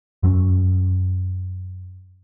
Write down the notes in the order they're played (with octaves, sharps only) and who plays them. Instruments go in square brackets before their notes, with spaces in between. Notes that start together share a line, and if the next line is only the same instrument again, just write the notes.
[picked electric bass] F#2 F#3 B3 C#4